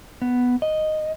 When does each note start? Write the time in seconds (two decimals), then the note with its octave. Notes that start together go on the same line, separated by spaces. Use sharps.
0.22 B3
0.62 D#5